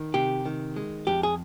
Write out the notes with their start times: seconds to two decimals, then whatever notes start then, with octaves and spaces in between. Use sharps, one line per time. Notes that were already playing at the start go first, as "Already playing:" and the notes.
Already playing: D#3
0.14 C3 G4
0.46 D#3
0.76 G#3
1.07 F2 G4
1.23 G#4